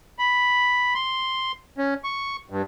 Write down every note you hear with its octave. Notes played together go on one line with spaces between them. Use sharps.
B5
C6
C#4
C#6
G2